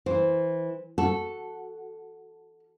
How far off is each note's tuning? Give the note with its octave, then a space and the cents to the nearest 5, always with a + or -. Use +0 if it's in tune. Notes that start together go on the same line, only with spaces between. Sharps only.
E3 -10 C5 +0
F#4 +0 A4 +0